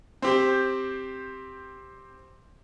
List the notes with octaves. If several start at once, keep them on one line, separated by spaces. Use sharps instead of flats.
C4 G4 C5